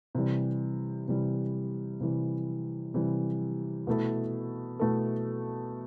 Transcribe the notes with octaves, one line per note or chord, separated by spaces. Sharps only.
C3 E3 G3
C3 E3 G3
C3 E3 G3
C3 E3 G3
B2 A3 E4 A4
B2 A3 E4 A4